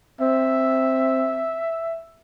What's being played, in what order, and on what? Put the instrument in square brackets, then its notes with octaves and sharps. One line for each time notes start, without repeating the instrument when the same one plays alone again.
[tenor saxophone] C4 [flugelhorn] E5